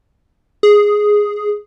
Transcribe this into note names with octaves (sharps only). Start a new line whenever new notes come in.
G#4